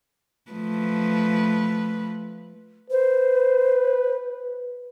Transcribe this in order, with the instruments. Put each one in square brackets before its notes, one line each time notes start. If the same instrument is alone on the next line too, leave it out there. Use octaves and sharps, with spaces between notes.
[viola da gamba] F3 A3 B4
[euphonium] B4 [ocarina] C5